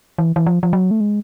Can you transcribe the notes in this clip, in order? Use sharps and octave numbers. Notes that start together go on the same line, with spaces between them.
E3
E3
F3
F3
F#3
A3
G#3